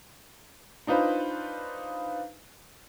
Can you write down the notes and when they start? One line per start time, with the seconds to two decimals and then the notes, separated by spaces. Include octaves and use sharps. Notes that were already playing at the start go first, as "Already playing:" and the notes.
0.87 D4 D#4 F4 B4 C5